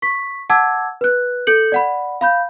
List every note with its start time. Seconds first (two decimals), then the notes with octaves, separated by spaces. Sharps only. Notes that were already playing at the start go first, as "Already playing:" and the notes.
0.02 C#6 B6
0.50 F#5 A5 D6 E6 G#6
1.01 B4 F#6
1.47 A4 G6 C#7 F#7
1.72 D5 F#5 B5
2.21 F5 B5 G6